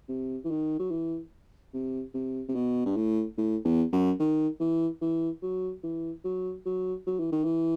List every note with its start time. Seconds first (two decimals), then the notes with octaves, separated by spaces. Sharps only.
0.09 C3
0.44 E3
0.51 D#3
0.79 F#3
0.91 E3
1.74 C3
2.14 C3
2.48 C3
2.55 B2
2.86 G2
2.96 A2
3.38 A2
3.65 E2
3.93 F#2
4.20 D#3
4.60 E3
5.02 E3
5.42 F#3
5.83 E3
6.25 F#3
6.65 F#3
7.07 F#3
7.20 E3
7.32 D#3
7.44 E3